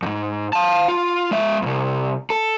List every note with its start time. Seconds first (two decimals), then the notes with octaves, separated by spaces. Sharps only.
0.03 F2 G#2
0.53 F5 A5
0.88 F4
1.31 G#3 E5
1.62 C2 F2
2.30 A4